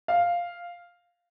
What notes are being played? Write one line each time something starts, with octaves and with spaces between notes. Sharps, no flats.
F5